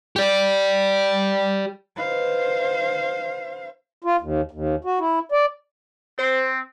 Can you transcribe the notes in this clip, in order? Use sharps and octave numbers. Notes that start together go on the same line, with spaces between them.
G4 D5
B4 C5 D#5 F5
F4
D#2
D#2
F#4
E4
D5
C4 C5